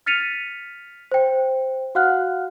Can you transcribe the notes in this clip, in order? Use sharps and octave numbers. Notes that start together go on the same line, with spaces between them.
F6 A6 B6 C#7 D#7 F7
C5 G5
F#4 F5 F#5 F6 F#6